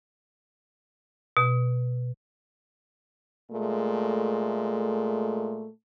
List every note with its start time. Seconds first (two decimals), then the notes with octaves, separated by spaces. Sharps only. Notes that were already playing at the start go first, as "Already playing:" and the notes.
1.37 B2
3.52 A#2 G#3 A3